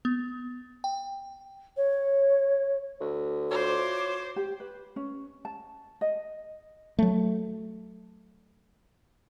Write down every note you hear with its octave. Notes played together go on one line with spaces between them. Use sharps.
B3
G5
C#5
D2
F4 F#4 C5 C#5 D6
G4
B4
C#4
A5
D#5
F#3 A3